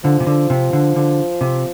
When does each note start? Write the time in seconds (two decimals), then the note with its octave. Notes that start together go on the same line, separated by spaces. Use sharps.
0.04 D3 F3
0.20 C3
0.27 D3
0.50 C3
0.73 D3
0.96 D3
1.41 C3